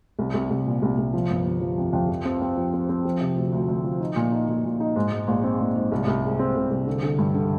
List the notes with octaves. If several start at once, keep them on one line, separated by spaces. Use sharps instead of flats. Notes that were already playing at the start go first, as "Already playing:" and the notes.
C2
C2
C2
A#2
C2
C2
F3
G1
G1
F3
F2
F2
F3
C4
C4
F3
C4
C4
F3
C3
D2
D2
D2
F3
D#4
A#2
D#4
A#2
A#2
D#4
G#2
G#2
A#1
C4
A#1
G#2
C2
C2
G#3
C4
C2
C2
D3
D3
G2
D3